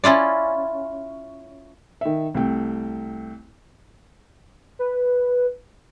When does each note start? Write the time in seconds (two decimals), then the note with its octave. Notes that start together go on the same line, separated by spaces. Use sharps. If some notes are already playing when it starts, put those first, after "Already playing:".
0.04 C#4 E4 F4 D5
2.01 D#3 E5
2.34 C2 A3 G5
4.79 B4